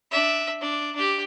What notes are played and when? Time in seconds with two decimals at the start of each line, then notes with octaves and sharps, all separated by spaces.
0.11 D4 E5
0.62 D4
0.95 D4 G4